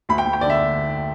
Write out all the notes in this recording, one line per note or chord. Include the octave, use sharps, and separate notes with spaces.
D2 B5
G5
D2
G5
D3 D5
E5